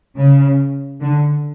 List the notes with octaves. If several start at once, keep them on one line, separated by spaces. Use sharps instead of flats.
C#3
D3